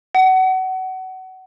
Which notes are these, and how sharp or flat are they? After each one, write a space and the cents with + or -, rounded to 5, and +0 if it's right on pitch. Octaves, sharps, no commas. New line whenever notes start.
F#5 +25